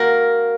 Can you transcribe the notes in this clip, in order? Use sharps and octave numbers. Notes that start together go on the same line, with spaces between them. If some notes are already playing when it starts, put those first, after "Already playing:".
Already playing: A#3 F#4 A#4